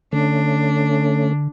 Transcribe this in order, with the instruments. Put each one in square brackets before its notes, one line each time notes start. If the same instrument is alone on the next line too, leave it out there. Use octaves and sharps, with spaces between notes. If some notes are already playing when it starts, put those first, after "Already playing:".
[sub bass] D3 [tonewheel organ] A3 C#4 [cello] D4